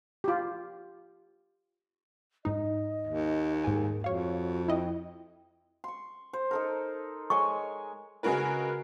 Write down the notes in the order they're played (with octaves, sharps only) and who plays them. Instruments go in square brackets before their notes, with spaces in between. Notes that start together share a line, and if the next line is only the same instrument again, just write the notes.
[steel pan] F4 G4
[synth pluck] G#2 D#4 [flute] D#5
[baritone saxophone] D#2
[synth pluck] G#2 G#5 [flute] G#4
[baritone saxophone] F2 [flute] F#4 [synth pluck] C#5 F5
[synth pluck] E4 D#5 [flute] G5
[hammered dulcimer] C6 C#6
C5
D#4 A4 A#4
[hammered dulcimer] G#3 C#5 G#5 [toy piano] C#6
[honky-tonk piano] C#3 G#3 F#4 A#4 B4